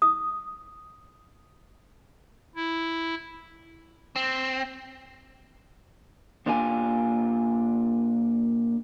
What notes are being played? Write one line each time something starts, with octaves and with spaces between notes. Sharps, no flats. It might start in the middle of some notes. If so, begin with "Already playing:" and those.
D#6
E4
C4
A#2 D4 F4 G4 G#5